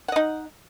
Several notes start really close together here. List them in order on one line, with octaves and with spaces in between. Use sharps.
F#5 D#5 D#4